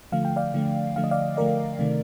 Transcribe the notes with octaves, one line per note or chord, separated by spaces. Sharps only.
D3 F3 A3 F5
G5
D5 F5
D3 F3 A3
D3 F3 A3 F5
D#5
D5 F5
D3 F3 A3 A#4 D5
C3 D#3 A3